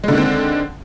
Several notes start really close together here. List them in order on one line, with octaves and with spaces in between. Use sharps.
G#3 D3 D#3 C4